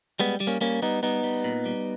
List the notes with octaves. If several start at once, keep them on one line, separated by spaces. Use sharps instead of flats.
G3 G#3 B3
G3
A#3 C#4
G3 A#3 C#4
G3 B3 D#4
G3 B3 D#4
G3
A#2
G3